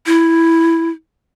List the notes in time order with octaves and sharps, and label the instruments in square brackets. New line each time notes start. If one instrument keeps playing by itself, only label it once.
[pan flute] E4